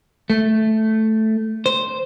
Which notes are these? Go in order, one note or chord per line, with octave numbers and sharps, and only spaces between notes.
A3
C5